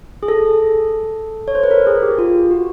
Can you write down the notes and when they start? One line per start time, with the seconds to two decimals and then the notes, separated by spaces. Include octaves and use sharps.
0.23 G#4
0.28 A4
1.48 C#5
1.55 C5
1.63 B4
1.71 A#4
1.87 G#4
2.02 G4
2.18 F4
2.51 F#4